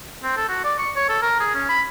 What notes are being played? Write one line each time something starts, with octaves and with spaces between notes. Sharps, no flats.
C4
A4
F#4
D5
C#6
C#5
A4
A#4
G#4
C#4
B5